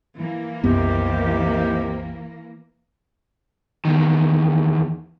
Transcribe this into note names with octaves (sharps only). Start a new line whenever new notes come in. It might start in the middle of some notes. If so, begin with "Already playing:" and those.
E3 A#3
C2 F#2 C3 D#3 B3 G4
E2 D#3